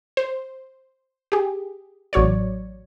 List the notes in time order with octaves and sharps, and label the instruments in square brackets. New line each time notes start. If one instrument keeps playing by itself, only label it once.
[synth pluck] C5
G4 G#4
A1 F#3 C#5 D5